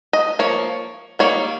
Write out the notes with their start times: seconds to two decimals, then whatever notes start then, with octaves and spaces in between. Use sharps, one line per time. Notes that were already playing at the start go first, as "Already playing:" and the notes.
0.13 D#5
0.39 F3 A#3 C#5
1.19 D#3 G3 A#3 C#5